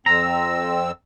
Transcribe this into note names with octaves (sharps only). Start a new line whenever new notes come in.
F2 C4 A#5 E6